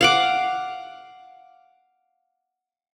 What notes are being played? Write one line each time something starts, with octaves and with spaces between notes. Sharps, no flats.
F5 F#5 D6